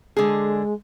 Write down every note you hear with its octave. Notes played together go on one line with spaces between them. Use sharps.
D3 G#3 G#4